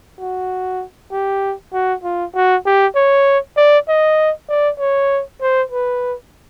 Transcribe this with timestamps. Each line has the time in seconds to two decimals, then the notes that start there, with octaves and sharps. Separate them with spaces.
0.20 F#4
1.12 G4
1.73 F#4
2.04 F4
2.35 F#4
2.66 G4
2.96 C#5
3.57 D5
3.88 D#5
4.49 D5
4.79 C#5
5.41 C5
5.72 B4